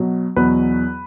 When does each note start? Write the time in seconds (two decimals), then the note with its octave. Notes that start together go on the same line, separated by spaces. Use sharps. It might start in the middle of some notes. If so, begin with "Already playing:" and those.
Already playing: B2 F#3
0.36 E2 B2 F#3 B4